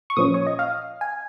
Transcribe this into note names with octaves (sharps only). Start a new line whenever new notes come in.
C#6
A#2 F3 C#4 D#6
C#5
D#5
F5
G#5